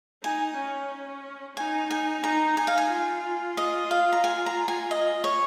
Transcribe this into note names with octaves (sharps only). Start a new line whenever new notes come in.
D#4 G#5
C#4
D#4 G#5
G#5
D#4 A#5
D#4 G#5
F5
G#5
F4
D#5
F5
A#5
G#5
A#5
G#5
D#5
C#5